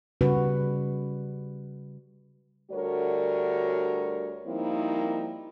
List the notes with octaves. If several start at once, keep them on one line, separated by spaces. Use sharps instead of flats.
C#3 G3 F#4 B4
D2 D3 G3 F#4 A#4 C#5
F3 G3 A#3 C4 D#4 E4